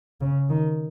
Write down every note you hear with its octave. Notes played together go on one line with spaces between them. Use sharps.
C#3
D#3